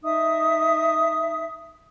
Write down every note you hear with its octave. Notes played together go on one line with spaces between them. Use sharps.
D#4 E5 D#6